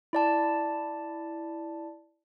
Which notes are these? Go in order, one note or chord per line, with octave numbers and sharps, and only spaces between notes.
E4 D5 A5